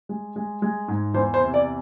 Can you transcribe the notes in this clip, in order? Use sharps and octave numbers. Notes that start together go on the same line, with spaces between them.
G#3
G#3
G#3
G#2
E2 C5
C5
C3
D5